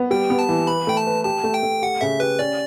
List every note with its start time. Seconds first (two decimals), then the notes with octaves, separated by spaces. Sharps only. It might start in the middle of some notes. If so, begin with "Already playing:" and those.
Already playing: B3
0.11 G3 G5
0.30 B3
0.39 A5
0.49 E3
0.67 B4 B5
0.87 A3 G5
0.97 A5
1.07 B4
1.25 G4 A5
1.44 A3
1.54 G5
1.63 A3
1.82 G4 F#5
2.01 C#3 E5
2.20 G4 B4
2.39 C#4 D5